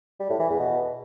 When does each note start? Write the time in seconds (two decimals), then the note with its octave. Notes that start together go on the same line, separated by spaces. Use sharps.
0.20 G3
0.30 A2
0.39 E3
0.49 E2
0.59 B2